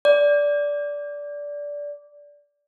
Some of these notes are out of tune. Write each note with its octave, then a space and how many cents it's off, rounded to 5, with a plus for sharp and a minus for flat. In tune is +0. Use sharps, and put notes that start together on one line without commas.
D5 -15